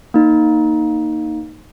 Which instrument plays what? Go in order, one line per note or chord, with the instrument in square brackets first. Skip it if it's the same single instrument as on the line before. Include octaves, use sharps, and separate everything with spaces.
[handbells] A#3 D#4